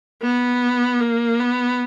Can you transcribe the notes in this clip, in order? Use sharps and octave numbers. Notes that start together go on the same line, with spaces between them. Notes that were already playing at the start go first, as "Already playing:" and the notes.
B3
A#3
B3